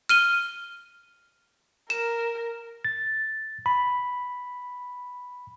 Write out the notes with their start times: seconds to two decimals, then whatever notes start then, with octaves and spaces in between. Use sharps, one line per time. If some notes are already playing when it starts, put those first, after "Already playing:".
0.09 F6 D#7 G7
1.90 A#4 E7
2.85 A6
3.66 B5